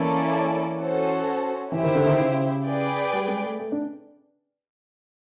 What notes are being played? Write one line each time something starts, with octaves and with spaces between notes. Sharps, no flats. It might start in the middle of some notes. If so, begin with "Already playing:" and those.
Already playing: E3 A#3 C#4 E4 A4 D5
C#4 F#4 A4 C5
E3 E4 G4 C5 E5
D#3
D3
D#3
C#3
G#4 B4 D5 G5
G3
G#3
A3
A3
D4